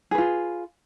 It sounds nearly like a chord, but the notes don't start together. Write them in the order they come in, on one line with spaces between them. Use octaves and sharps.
G#4 B4 F4